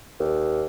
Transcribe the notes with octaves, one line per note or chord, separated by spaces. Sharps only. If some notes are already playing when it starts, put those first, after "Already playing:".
D#2